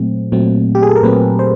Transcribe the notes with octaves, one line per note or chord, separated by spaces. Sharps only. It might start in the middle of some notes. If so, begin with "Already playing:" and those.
Already playing: A#2 F#3 A3 C4
A#2 F#3 A3 C4
G4
G#4
A4
A#4
A#2 F#3 A3 C4 B4
C5